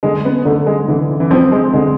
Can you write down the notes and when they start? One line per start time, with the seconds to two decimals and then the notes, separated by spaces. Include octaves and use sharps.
0.03 D3 G#3
0.25 B3
0.45 D3 A3
0.66 G#3
0.88 D3 E3
1.09 E3
1.20 E3
1.31 F3 C4
1.52 G#3
1.73 D3 G#3